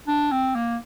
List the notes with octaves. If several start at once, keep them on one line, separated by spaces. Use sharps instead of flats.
D4
C4
A#3